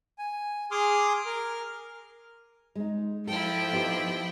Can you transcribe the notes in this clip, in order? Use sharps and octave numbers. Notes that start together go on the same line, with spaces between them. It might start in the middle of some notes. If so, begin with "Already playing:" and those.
G#5
G#4 C6 D6 D#6 F6
A#4 F6
G#3 D#4
F3 E4 A4 G5
B3 D#4 G4